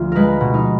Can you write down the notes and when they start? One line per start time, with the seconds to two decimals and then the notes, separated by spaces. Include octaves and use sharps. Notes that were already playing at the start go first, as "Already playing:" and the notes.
Already playing: D2 F3 F4
0.12 G#3 A#4 B4
0.41 B2
0.54 D#4